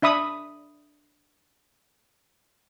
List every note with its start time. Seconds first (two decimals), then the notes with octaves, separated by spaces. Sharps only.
0.02 D4 E5 B5 D#6